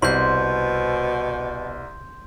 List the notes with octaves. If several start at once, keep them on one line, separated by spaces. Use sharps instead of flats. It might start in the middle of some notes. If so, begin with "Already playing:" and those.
C2 B2 C5 C6 G6